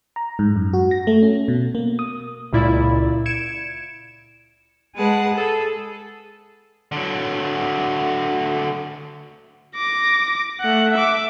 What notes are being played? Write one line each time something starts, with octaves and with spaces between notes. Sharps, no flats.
A#5
G#2
F#2
F#4
A#6
A3
C#4
B2
A#3
D#6
C#2 A#2 E4 D5
G#6 C#7 D7 E7
G#3 G#4 B4 F#5 A5
G#4 A4
D3 F#3
D6 A#6
A3 F#5
E5 D6